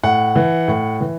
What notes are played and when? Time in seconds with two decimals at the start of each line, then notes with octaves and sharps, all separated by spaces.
0.03 A2 F#5
0.35 E3
0.68 A2
1.00 E3